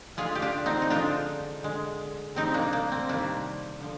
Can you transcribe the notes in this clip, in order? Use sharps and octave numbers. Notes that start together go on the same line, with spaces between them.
D3 G#3 F4 G#4
G4
D4 F4
C4 D#4
D#4
D3 F3 G#3 D4 F4
D3 G#3
C3 G3 C4 D#4
A#3 D4
A#3
C4
C3 D#3 G3 A#3 D4
D3 F3